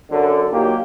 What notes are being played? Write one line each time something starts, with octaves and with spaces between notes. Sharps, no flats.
F#2 D3
A#2 F#3 A#3 D#4 G4